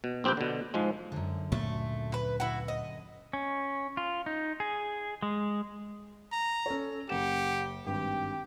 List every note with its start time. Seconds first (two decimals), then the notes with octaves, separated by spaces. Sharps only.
0.04 B2
0.24 A#1 C4 G4 B4 G5
0.37 B2 D3
0.74 G#2 F3 G#3
1.12 F#2 D3
1.52 D2 A#2 F#3 A3
2.14 B4
2.40 E4 F#4
2.68 D#5
3.33 C#4
3.97 F4
4.26 D#4
4.60 G#4
5.22 G#3
6.32 A#5
6.66 C#4 A4 C#5
7.09 F#1 G4 F#5 E7
7.86 G#1 G2 G4 G5